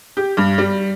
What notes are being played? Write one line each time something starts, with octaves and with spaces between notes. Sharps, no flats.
G4
G2
G3